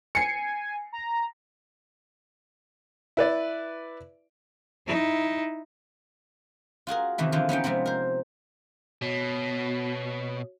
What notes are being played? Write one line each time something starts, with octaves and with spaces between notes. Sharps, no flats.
G#5 C7 C#7
A#5
E4 B4 D5
D#4 E4
F4 F#4 G#4 A#4
C3 D#3 E3 E4
D3 E3 F3 F4
B3 C#4 D#4 G5
C3 F3 G#3 B3 C4
A#4 C5
B2 F#4 C#5